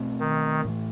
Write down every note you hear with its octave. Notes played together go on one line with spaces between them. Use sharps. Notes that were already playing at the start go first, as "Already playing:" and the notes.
Already playing: B2 A3 C4
D#3
A2 E3 A3